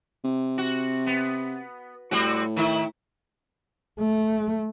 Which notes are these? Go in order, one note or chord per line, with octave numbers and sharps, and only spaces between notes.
C3
F#4
B3
A2 G3 C4 F#4
D#3 E4
A3